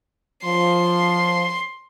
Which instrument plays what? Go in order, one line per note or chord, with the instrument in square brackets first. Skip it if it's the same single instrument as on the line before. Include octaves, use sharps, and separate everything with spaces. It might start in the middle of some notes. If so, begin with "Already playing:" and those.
[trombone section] F3 [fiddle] C6